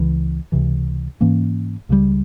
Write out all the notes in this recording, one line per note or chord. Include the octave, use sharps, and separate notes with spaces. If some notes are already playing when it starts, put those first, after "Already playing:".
Already playing: C#2 C#3 E3
C#2 C3 E3
G#2 E3 A#3 C#4
C#2 C#3 E3 G3